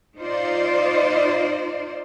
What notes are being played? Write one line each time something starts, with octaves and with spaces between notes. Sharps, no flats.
D#4 F4 C5 D5